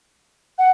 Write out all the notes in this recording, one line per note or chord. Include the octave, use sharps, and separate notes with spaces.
F#5